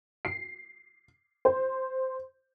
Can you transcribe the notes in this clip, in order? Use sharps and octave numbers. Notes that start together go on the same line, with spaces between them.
C7
C5